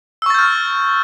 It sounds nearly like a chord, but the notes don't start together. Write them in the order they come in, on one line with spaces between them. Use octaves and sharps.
E6 C#6 A6 G6 F6